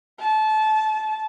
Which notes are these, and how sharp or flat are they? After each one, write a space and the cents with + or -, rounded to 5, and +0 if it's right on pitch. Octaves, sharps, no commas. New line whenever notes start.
A5 -25